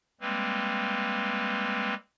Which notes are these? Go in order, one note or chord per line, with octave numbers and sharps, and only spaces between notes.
G3 G#3 A#3 C4 B4